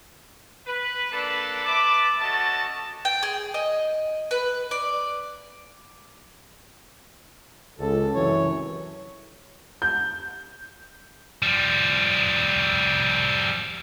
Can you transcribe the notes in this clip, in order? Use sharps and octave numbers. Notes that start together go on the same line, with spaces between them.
B4
A#3 D4 A4 B4 D5
B4 E5 A5 D6
C#4 F#4 A4 D#5 A5
G5
G#4
D#5
B4
D5
C#2 A4
C2 F#2 E3 C#5
G6
F3 G3